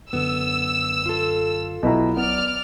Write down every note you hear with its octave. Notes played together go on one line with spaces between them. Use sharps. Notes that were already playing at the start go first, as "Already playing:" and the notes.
F#2 D3 B3 E6
F4 A4
B1 B2 F#3 E4 A#5
B3 D5 F6